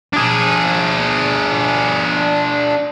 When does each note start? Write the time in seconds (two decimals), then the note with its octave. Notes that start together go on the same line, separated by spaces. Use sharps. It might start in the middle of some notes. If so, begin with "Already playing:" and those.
0.13 D4 G#4